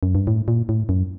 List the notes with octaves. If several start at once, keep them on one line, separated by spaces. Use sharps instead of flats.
F#2
G2
A2
A#2
A2
F#2